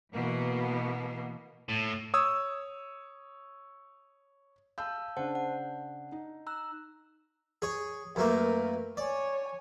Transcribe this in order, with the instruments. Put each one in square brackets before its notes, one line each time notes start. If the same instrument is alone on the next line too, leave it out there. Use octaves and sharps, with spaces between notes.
[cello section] B2 E3 A#3 B3
[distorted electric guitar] A2
[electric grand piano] C#5 D#6 E6
[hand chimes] F5 A5 [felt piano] E6 G6
[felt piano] C#3 D4 [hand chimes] C5 F#5 A5
[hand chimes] F#5
[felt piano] D#4
[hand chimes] A#5 E6 F#6
[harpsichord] G#4 C#5
[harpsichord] F#2 A3 A#3 [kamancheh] A#4 B4
[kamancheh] C#5 G#5 [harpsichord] D5